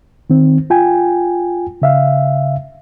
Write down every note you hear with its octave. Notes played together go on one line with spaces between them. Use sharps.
D#3 C4
F4 G5 G#5
C#3 E5 F5